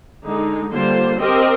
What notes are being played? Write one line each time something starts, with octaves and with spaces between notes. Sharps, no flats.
D3 G#3 D#4
D3 G3 A#3 F4 C5
C4 G4 A#4 D#5